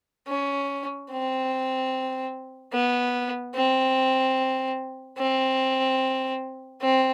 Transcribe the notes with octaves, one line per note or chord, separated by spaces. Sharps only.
C#4
C4
B3
C4
C4
C4